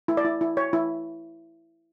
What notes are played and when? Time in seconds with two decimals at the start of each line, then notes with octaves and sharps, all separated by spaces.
0.08 E4
0.17 D5
0.25 E4
0.41 E4
0.57 C#5
0.73 E4